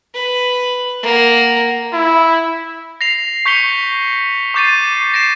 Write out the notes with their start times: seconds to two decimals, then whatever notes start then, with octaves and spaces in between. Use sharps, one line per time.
0.14 B4
1.03 A#3 F#5
1.93 E4
3.01 A#6 C7 F7
3.45 C#6 G6 B6 C#7 F7 G7
4.54 C#6 D6 G6 A6 C7 D#7
5.14 A#6 C7 D7 E7